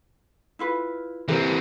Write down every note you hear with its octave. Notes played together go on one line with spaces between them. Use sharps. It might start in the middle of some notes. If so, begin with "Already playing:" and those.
E4 F4 B4
E3 C4 G4 A#4 E5